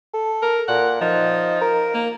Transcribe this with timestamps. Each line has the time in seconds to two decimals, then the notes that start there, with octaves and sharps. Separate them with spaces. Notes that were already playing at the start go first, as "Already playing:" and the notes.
0.14 A4
0.42 A#4
0.68 A#2 F#5
1.01 F3 D#4
1.61 A#4
1.94 A#3